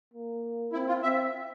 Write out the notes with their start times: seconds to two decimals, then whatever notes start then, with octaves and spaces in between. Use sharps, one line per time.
0.14 A#3
0.73 C4 E4
0.88 F4
1.03 C4 E5